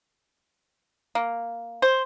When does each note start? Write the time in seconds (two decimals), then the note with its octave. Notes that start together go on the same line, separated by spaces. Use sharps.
1.15 A#3
1.82 C5